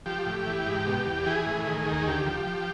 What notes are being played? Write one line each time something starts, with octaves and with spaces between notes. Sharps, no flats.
F3 G4
A2
E3
G#2
B2
E2
E3 G#4
A2
D#3
D#2
D2 G4
F3
F3